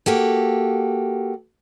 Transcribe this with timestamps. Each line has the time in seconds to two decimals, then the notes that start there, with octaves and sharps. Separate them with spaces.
0.06 A#3 F#4 G4 A4